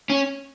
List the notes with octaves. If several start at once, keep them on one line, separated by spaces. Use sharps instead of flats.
C#4